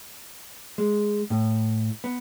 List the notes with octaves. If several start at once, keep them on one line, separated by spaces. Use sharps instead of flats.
G#3
A2
B3